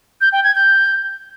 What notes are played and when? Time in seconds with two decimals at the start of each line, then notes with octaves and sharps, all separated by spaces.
0.21 G6
0.32 G5
0.44 G#6
0.55 G6